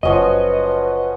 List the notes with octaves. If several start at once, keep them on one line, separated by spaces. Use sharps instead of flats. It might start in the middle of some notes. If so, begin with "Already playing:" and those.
F#1 F3 C#4 F#4 B4 D#5